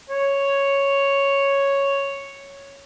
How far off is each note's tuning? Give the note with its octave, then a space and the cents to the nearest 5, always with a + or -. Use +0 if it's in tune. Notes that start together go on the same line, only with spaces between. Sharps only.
C#5 +0